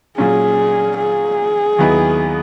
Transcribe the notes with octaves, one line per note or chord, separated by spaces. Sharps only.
A#2 F#3 C#4 G#4
G#4
D#2 D#3 F#3 B3 E4